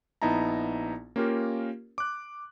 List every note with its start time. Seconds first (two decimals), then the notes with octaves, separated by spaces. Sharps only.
0.22 A#1 B3 D#4 E4 A5 A#5
1.16 A#3 C#4 F4 G4 A#4
1.98 D6 F#6